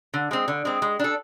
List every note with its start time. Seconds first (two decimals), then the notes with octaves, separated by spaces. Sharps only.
0.14 D3
0.31 G#3 C4
0.48 D3
0.65 G#3 C4
0.82 G#3
0.99 D4 A4